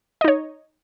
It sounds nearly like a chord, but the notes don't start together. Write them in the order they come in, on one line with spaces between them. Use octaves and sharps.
D#5 D#4 C#5